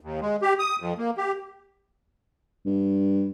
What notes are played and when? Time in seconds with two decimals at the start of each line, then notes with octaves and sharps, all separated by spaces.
0.01 D#2
0.21 G#3
0.42 G4
0.59 D#6
0.80 F2
0.98 A#3
1.17 G4
2.66 G2